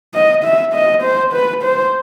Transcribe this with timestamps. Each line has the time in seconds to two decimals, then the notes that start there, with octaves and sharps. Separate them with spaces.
0.14 D#5
0.44 E5
0.74 D#5
1.03 C5
1.33 B4
1.63 C5